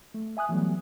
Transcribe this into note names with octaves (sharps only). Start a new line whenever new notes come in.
A3
E5 G#5 D#6 F#6
E3 F#3 G3 A3 B3